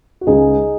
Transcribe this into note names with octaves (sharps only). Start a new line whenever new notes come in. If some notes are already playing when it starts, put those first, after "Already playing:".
F#4
C#2 C#3 D#4 G#4